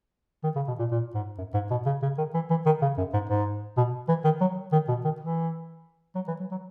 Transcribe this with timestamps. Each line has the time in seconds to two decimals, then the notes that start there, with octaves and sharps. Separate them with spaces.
0.44 D#3
0.56 C#3
0.68 B2
0.79 A#2
0.91 A#2
1.14 G#2
1.38 F#2
1.54 G#2
1.71 B2
1.86 C#3
2.03 C#3
2.18 D#3
2.34 E3
2.50 E3
2.66 D#3
2.82 C#3
2.98 F#2
3.14 G#2
3.29 G#2
3.77 B2
4.09 E3
4.24 D#3
4.41 F#3
4.72 D#3
4.89 B2
5.04 D#3
5.20 E3
6.15 F#3
6.28 E3
6.40 F#3
6.51 F#3